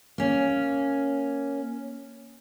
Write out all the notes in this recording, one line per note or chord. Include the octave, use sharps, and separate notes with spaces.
A#3 C#4